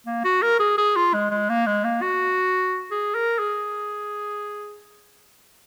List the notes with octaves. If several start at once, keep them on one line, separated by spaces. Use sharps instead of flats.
A#3
F#4
A#4
G#4
G#4
F4
G#3
G#3
A#3
G#3
A#3
F#4
G#4
A#4
G#4